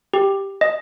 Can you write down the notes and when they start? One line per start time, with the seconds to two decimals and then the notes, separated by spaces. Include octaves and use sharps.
0.14 G4
0.61 D#5